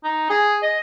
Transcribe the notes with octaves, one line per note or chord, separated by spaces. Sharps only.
D#4
G#4
D#5